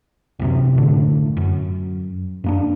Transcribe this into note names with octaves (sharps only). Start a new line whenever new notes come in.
C2 F#2 C3
F#1 A2 D3 A3
F#2
F#2 A#3 D4